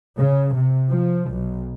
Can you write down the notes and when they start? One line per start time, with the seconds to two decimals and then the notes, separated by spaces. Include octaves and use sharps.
0.17 C#3
0.55 C3
0.90 F3
1.32 B1